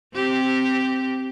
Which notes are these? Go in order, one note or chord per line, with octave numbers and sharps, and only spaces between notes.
C4 G4